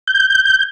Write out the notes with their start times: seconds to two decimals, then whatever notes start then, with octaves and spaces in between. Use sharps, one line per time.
0.07 G6